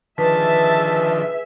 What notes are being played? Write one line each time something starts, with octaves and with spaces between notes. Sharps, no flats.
D3 D#3 F3 G#4 B4 E5 A5